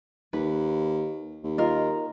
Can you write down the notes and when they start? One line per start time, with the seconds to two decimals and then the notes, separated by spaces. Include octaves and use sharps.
0.33 D#2 B4
1.44 D#2
1.58 F4 A#4 D#5